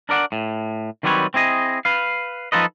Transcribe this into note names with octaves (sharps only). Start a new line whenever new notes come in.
D4 A#4 D5 F#5
A2
D#3 F#3 G3 C4 B4 C#5
C4 E4 G#4 D#5
B4 F5
F3 D#4 F4 A4 B4 D#5